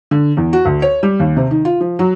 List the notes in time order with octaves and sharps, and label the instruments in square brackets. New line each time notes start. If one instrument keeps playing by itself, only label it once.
[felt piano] D3
E2
F#4
D2
C#5
G3
D#2
C3
D#3
F4
F3
F#3